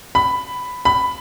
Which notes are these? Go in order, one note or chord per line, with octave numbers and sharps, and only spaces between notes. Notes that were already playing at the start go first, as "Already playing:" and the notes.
B5
B5